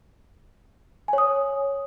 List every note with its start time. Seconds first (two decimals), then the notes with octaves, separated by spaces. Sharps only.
1.08 G#5
1.13 C#5
1.18 D#6